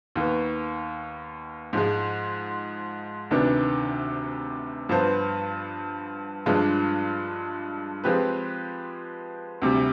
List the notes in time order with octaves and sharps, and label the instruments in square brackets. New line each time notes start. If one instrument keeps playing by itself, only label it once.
[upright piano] D#2 D#3 B3
G#2 F3 G#3
D2 C3 D#3 B3 D4
G2 F3 B3 F4 C5
G2 F3 G#3 D4 F4
F3 G#3 C4 G4 B4
D2 C3 G3